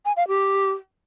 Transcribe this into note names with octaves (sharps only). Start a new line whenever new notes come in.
G#5
F5
G4